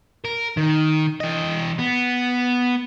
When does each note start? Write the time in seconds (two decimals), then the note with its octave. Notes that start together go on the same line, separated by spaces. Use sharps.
0.25 A#4
0.57 D#3
1.20 E3 D#5
1.79 B3